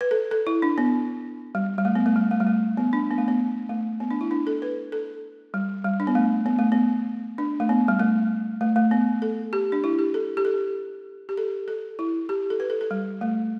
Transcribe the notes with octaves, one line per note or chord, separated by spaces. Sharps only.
B4
A4
A4
E4
D4
B3
G3
G3
A3
B3
A3
G3
A3
G3
A3
B3
D4
B3
A3
B3
A3
B3
D4
E4
D4
A4
B4
A4
G3
G3
D4
B3
A3
B3
A3
B3
D4
A3
B3
G3
A3
A3
A3
B3
A4
G4
D4
E4
G4
A4
G4
A4
G4
A4
A4
E4
G4
A4
B4
A4
A4
G3
A3